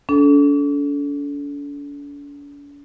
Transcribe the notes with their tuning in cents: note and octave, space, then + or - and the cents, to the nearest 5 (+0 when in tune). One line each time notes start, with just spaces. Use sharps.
D4 -45 A4 -20